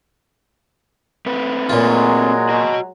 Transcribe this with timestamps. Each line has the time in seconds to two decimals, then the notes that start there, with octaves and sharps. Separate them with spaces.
1.26 A3 C4 B4
1.69 A#2 F#3 G#3 F4
2.49 F#4 D#5